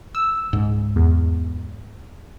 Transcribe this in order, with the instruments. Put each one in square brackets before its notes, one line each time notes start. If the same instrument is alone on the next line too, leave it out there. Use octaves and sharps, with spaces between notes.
[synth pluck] E6
[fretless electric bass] C#2 G#2
[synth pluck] E2